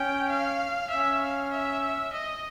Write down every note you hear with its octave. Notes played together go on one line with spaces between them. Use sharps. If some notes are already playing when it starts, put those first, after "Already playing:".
Already playing: C#4 G5
F5
C#4 E5
F5
E5
D#5